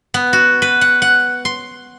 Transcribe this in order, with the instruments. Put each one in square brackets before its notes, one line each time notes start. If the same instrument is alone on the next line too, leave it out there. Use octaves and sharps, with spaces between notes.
[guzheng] B3
F#4
B4
F#5
F#5
C6